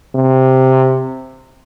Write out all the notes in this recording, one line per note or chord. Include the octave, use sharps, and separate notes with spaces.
C3